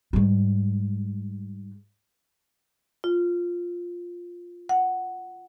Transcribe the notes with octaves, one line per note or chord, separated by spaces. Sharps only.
G#2 G3
F4
F#5